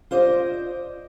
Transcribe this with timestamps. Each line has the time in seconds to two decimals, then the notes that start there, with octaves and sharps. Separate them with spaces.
0.11 F4 C5 D5 D#5